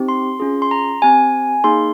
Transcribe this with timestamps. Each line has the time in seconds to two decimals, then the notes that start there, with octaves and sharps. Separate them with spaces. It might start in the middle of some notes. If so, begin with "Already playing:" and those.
Already playing: C4 D#4 G4
0.08 C6
0.40 C#4 F4 G#4
0.62 C6
0.71 A#5
1.02 C4 G4 G#5
1.64 A#3 D#4 G#4 C6